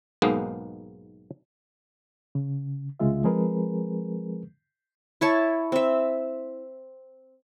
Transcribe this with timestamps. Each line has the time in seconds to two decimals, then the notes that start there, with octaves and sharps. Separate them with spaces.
0.22 B1 G#2 G#3 A#3 B3 D#4
2.35 C#3
3.00 C2 C#3 G#3 F4 E5
3.24 F3 G#3 C4 G#4 A#4 B4
5.21 E4 C#5 A5
5.72 C4 E5